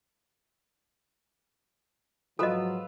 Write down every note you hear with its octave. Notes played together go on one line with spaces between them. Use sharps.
G#2 F3 F#3 F4 A4 B4 D#5 E6